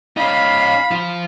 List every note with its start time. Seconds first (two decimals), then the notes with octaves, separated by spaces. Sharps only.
0.17 C#4 D#4 F5 B5
0.91 F3 F4